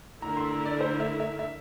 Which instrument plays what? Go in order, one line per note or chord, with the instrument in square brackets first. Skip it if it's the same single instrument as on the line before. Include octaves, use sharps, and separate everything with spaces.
[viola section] D3 A3 E4 A#4 [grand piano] A#5
[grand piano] C6
A#5
D5
C5
E5
E5
E5